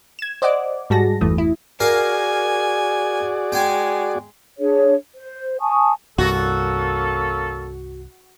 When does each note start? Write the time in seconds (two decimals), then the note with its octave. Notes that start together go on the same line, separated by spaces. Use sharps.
0.19 G#6 E7
0.42 C5 D5 D#5 F#5 D6
0.90 G#2 G3 F#4 G#4 A5 A#6
1.21 G1 E2 E3 A3 D#6
1.38 E4
1.80 F#4 G#4 A#4 D5 F5 G#5
3.52 G#3 G5 G#5
4.58 D4 G#4 C#5
5.15 C5
5.60 G#5 A5 C#6 D#6
6.18 C2 G2 A#3 C#4 F#4 A4